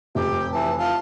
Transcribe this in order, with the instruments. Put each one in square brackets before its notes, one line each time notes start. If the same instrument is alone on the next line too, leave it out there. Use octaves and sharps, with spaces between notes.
[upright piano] F1 [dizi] G4
[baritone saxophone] E3 [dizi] A5
[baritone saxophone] F4 [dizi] A5